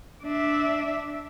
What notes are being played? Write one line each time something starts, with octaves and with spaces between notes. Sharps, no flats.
D4 E5